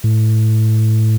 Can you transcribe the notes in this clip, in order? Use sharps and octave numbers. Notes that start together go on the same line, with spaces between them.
A2